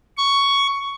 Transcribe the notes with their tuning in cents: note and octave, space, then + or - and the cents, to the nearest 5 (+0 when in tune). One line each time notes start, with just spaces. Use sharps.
C#6 +10